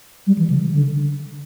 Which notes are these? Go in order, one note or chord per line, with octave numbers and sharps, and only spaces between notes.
G3
E3
C#3
D3